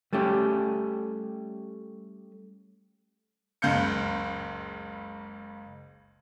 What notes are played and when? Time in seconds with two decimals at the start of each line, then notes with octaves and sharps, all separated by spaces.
0.13 G3 A3 C#4 G4
3.62 F#1 C#2 C#3 F5 G6 C#7